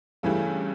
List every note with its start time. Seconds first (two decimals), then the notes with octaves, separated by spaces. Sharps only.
0.23 G2 C#3 E3 A3 E4 G4